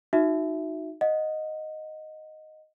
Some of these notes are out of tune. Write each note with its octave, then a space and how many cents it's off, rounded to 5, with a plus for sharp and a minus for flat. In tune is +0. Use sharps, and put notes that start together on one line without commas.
D#4 +0 F#4 -20 E5 +0
D#5 +0 F#5 -25